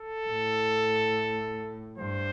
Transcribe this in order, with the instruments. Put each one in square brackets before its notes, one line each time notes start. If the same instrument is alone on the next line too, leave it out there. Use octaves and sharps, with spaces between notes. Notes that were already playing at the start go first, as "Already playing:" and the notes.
Already playing: [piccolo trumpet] A4
[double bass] A2
[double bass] G2 [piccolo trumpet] C5